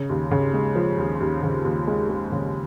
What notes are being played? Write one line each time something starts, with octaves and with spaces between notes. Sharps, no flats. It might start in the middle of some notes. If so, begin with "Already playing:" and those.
Already playing: C#3
D#2
C#3
G#3
F3
D#2
D#2
C#3
D#2
G#3
G#3
C#3